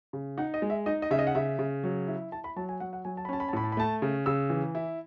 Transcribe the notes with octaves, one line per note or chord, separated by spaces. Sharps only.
C#3
D#4 F#5
D#5
G#3
E5
D#4 D#5
D#5
C#3 E5
D#5
F#5
C#3 E5
C#3
F#3
E4
E4 A5
B5
F#3 A5
G#5
F#3 F#5
F#5
F#3 G#5
A5
B5
C#4 A5
B5
A5
A2 B5
A5
B5
A3 A5
C#3
C#3 E6
E3
E4